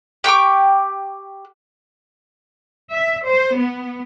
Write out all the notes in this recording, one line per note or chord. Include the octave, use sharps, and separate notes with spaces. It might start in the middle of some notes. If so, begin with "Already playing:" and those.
G4 G5 C#6 D6
E5
C5
B3